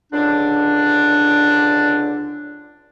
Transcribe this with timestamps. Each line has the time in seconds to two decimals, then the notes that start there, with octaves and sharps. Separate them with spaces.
0.12 C#2 D3 D4